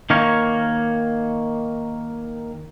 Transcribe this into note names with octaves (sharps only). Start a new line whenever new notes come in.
D#3 A#3 A#4 C#5